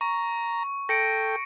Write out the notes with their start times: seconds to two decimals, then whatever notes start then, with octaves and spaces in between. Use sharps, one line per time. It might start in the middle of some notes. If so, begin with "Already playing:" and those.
0.01 A#5 C#6
0.89 A4 G5 A#6 C#7 D7